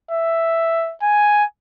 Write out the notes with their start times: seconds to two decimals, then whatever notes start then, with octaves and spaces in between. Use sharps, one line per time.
0.11 E5
1.03 G#5